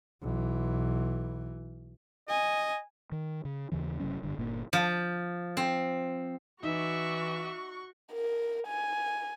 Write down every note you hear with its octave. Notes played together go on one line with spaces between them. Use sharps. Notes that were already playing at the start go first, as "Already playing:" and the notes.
B1 E3
D#5 G#5
D#3
C#3
D#2 C#3 E3
F#1 C3 F#3 C#4
F#1 G2 D3
G1 A#2 A#3
F3
C4
E3 D#4 F#4 D5 E5 C#6
A#4
G#5